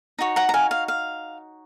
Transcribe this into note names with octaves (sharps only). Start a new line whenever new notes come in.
D#4 F#4 C#5
F#5 A#5
A#5
F5 G#5
F5
F5